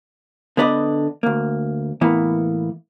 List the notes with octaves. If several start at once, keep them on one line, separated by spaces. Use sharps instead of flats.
D3 B3 B4 D5 D#5
D2 A#3
A2 E3 A#3 B3